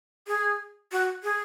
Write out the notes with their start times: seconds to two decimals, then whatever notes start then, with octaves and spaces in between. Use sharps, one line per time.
0.27 G#4
0.92 F#4
1.23 G#4